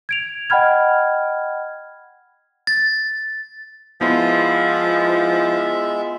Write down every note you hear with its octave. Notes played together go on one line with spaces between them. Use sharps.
G#6 D7 F7
D#5 F#5 G5 B5 F6 G#6
A6
F3 G#3 B3 E4 F4 E5